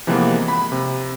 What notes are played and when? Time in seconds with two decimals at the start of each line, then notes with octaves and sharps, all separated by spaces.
0.07 C3 E3 F3 G#3 A#3 B3
0.48 B5
0.72 C3